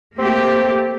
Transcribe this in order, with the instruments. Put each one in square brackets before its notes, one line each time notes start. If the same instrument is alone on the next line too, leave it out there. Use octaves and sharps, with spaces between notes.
[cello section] A3 A#3 G4 [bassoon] C4